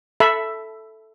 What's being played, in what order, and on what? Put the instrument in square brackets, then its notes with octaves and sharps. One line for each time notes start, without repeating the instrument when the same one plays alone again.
[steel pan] A4 E5 B5